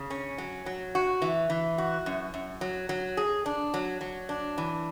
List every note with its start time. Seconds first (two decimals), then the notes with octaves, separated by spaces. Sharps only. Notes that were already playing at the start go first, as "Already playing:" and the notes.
Already playing: C#3
0.10 C#4
0.38 F#3
0.66 F#3
0.95 F#4
1.22 E3
1.50 E3
1.78 F#4
2.06 F#2
2.34 F#2
2.61 F#3
2.89 F#3
3.17 G#4
3.46 D4
3.74 F#3
4.01 F#3
4.29 D4
4.58 E3